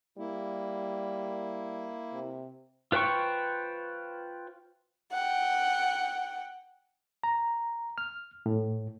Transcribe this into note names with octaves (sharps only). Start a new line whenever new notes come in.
G3 A#3 E4
C3
F4 B4 C5 G5 C#6
F#5 G5
A#5
F6
A2